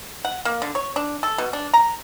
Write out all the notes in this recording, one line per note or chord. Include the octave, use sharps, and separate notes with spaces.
F#5
A#3
D3
C#5
D4
A4
B2
D4
A#5